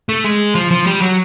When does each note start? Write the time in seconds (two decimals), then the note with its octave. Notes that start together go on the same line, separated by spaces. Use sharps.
0.09 A3
0.24 G#3
0.55 F3
0.71 F3
0.87 G3
1.01 F#3